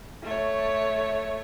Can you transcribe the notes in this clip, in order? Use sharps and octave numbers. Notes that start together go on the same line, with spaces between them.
A3 C#5